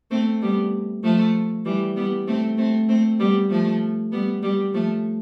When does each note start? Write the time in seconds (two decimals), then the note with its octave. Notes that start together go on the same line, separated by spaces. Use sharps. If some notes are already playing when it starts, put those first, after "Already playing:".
0.11 A3 C4
0.42 G3 B3
1.04 F3 A3
1.65 E3 G3
1.96 G3 B3
2.27 A3 C4
2.58 A3 C4
2.89 A3 C4
3.19 G3 B3
3.50 F3 A3
4.12 G3 B3
4.43 G3 B3
4.73 F3 A3